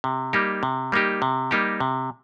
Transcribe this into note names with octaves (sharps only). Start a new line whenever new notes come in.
C3
G3 A#3 D#4 G4
C3
G3 A#3 D#4 G4
C3
G3 A#3 D#4 G4
C3